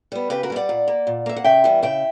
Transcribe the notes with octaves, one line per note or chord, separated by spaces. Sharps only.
G3 B3
C#3 G4 B4
F#4 A#4
G3 B3
D5 F#5
A#2
A#3
A#2
A#3 E5
F#5
C#3 E5 G5
E3 G3 B3
C#3 E5 G5